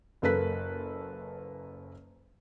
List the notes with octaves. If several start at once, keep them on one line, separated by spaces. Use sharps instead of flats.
F#1 F#2 A#3 A4 B4 B6